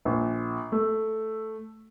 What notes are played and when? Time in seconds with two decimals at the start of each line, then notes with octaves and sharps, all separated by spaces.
0.05 A#1
0.72 A3